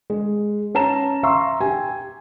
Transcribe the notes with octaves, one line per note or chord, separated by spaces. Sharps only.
G#3
C#4 A5 A#5 E7
E5 F5 A#5 C6 C#6 E6
G4 G#5